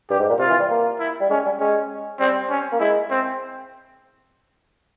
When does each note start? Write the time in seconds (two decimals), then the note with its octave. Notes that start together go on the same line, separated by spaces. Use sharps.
0.10 G2 G4
0.19 G#2
0.29 A#2
0.39 C3 F4
0.50 E3
0.60 G3
0.70 A#3
0.99 E4
1.21 G3
1.30 G#3 C#4
1.45 G3
1.60 G#3 C#4
2.20 G3 C4
2.50 C#4
2.72 A#3
2.80 G#3 E4
3.10 C4